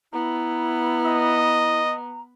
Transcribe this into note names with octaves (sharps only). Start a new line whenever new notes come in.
B3 E4 A#5
D#5